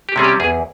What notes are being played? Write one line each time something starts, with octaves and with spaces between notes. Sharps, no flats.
G4
C3 G3 C#4 G#4
G4
E2 G#4